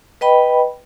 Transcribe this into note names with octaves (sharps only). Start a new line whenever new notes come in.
B4 D#5 G5 B5